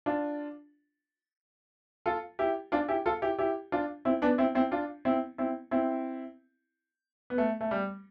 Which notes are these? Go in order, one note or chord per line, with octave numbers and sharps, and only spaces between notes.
D4 F4
F4 A4
E4 G4
D4 F4
E4 G4
F4 A4
E4 G4
E4 G4
D4 F4
C4 E4
B3 D4
C4 E4
C4 E4
D4 F4
C4 E4
C4 E4
C4 E4
B3
A3
A3
G3